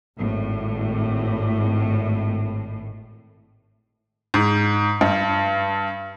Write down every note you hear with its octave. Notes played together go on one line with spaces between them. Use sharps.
G#1 A2
G#2
G2